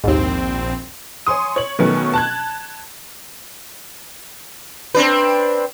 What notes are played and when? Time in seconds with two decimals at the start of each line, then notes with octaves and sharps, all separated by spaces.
0.04 A#1 D#2 G#2 C4
1.26 C#5 G#5 C6 D#6
1.56 C#5 F#7
1.79 B2 D#3 F#3 A3 B3 C#4
2.14 A5 F#6 G#6
4.95 C4 D4 B4